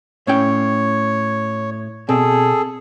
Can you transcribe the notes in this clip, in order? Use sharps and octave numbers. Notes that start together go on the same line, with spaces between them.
A2 C#4 C#5 G5
B2 C4 G#4 A4